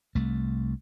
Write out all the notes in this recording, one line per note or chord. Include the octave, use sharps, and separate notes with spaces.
C2 A3